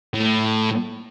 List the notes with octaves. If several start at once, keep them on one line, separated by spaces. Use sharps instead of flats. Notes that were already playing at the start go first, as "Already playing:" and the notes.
A2